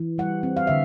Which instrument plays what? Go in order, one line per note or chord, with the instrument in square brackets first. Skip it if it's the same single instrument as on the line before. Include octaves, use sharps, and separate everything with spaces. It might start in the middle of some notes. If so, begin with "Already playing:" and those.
Already playing: [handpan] E3
G3 F#5
C4
F5
D3 E5